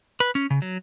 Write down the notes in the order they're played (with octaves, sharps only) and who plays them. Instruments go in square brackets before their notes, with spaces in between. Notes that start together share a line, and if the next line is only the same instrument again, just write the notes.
[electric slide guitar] B4
C#4
C#3
F#3